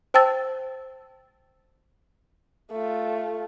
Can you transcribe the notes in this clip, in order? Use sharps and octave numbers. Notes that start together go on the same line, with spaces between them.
C5 G5 A5 E6 A6
A3 F4